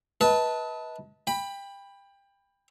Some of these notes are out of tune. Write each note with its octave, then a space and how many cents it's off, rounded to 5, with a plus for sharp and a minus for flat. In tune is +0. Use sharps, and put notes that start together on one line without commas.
B4 -15 D#5 +40 A5 +0
G5 +25 B5 +0